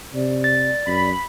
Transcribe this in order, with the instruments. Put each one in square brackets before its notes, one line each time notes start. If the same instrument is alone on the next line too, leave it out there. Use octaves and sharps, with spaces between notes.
[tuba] C3 [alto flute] D5
[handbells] A6
[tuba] F#2 [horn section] B5